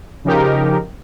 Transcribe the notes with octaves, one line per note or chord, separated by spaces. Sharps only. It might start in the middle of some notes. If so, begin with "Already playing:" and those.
C#3 F3 D#4 G4 A#4